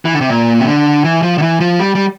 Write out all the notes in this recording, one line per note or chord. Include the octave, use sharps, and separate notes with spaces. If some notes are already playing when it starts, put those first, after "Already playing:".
E3
D3
C3
A#2
C3
D3
E3
F3
D3
E3
F3
G3
G3